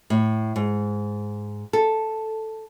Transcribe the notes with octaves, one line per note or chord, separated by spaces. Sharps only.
A2
G#2
A4